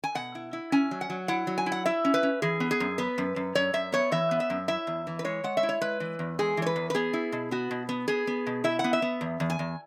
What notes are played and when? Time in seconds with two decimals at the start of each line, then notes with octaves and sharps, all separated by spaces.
0.04 G#5
0.15 B2 F#5
0.35 E4
0.53 E4
0.72 C#4 G#5
0.91 F#3
1.01 F#5
1.10 F#3
1.28 E4 F#5
1.47 F#3
1.58 G#5
1.66 E4
1.72 F#5
1.86 E4 E5
2.05 C#4
2.14 B4
2.23 C#4
2.42 E3 G#4
2.60 B3
2.71 G#4
2.80 F#2
2.98 B3 B4
3.18 F#2
3.36 F#2
3.55 F#2 C#5
3.74 F#2 E5
3.92 B3 C#5
4.12 E3 E5
4.31 B3
4.40 E5
4.50 F#2
4.68 E4 E5
4.87 E2
5.07 E3
5.19 B4
5.24 G#3 C#5
5.44 G#3 F#5
5.57 E5
5.63 E4
5.69 C#5
5.81 G#3 B4
6.00 E3
6.19 E2
6.39 G#3 G#4
6.57 E3 C#5
6.66 B4
6.76 E2
6.90 B4
6.95 B3 G#4
7.13 E4
7.32 B2
7.51 B3 F#4
7.71 B2
7.89 B3
8.08 B3 G#4
8.27 B3
8.47 B2
8.64 E4 E5
8.79 F#5
8.84 B3
8.93 E5
9.02 B3
9.21 E2
9.40 E2
9.50 G#5
9.59 E2